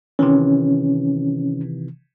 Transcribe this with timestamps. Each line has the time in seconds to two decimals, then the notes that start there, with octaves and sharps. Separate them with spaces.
0.19 C3 D#3 E3 C#4